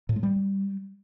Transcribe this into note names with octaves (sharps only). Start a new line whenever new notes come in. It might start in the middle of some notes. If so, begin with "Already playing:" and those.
A2
G#3
G3